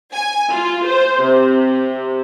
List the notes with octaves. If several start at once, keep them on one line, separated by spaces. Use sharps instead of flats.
G#5
F4
C5
C3